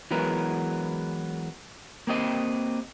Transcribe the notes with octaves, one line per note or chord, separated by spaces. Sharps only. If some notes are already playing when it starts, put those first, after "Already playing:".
E3 F#3 G#3 B3 A#4
A#3 C4 G4 D#5